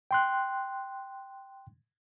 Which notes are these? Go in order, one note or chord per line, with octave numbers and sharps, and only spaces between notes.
G5 C6 F#6